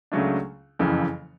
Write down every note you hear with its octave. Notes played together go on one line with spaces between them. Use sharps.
C#2 C#3 F#3 A3 D4
F#1 F2 C#3 E3